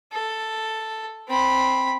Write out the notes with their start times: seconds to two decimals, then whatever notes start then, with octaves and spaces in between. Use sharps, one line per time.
0.13 A4
1.29 C4 B5